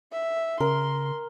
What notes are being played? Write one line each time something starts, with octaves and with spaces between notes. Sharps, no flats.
E5
C#3 A#4 C6